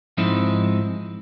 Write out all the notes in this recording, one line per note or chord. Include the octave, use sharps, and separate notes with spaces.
G#2 F3 G#3 C4 D#4 E4